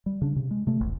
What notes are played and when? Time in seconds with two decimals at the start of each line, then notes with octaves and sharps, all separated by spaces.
0.06 G3
0.22 C#3 D4
0.36 C3
0.51 G#3
0.67 C3 A3
0.80 E1 A#1